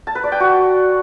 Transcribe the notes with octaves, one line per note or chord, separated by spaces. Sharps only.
A5
B4
D5
G5
F#4